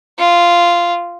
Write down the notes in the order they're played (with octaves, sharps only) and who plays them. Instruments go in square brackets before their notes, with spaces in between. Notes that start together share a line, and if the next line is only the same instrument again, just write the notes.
[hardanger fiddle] F4